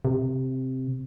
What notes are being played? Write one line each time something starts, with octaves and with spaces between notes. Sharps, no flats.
C3